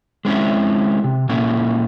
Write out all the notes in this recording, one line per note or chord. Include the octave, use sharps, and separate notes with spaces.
G#3 C4 C#4 E4
C3
A#2 A#3 C#4 E4